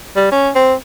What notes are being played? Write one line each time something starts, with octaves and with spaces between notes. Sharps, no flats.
G3
C#4
C4